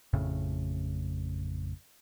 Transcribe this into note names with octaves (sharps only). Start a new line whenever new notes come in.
A1 F2 A2 C#3